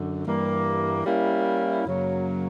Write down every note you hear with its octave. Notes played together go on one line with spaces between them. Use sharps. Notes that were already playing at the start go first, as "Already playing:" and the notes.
Already playing: F#2 D3
G2 E3 G3 A#3
G3 A#3 C#4 E4
F#2 C#3 F#3 A#3